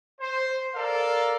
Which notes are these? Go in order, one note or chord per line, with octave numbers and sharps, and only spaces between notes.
C5
A4 A#4 D5 F5